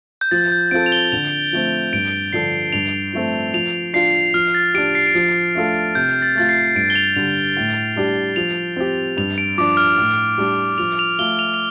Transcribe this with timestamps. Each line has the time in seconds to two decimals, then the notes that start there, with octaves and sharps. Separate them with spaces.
0.21 G6
0.31 F3 A6
0.52 G6
0.71 C4 F4 A4 D7
0.86 F7
0.92 G7
1.12 D3 F7
1.53 F3 A3 C4
1.93 G2 D7
2.33 D3 F3 D4 A4 C7
2.73 G2 F7
3.13 F3 A3 C4 A4
3.54 F3 F7
3.94 D4 F4 C7
4.34 F3 F6
4.54 A6
4.74 G4 D7
4.78 D4
4.95 C7
5.07 D7
5.14 F3 C7
5.55 A3 D4 F4 A4
5.95 C3 G6
6.22 A6
6.35 A3 F4 A6
6.49 C7
6.75 G2 D7
6.90 G7
6.95 F7
7.16 D3 G3 F7
7.57 A2
7.96 G3 D4 G4
8.36 F3 F7
8.77 C4 G4
9.17 G2 F7
9.38 D7
9.58 F3 D4 D6
9.77 F6
9.98 A2
10.38 G3 D4 G4
10.78 F3 F7
10.99 F7
11.19 A3 F4 G7
11.39 F7
11.54 F7